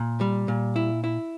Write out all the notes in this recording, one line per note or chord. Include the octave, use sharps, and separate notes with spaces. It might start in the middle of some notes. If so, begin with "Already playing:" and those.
Already playing: A#2
G3
A#2
E4
E4